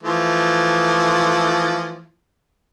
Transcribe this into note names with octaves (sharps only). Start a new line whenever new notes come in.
E3 F3 A3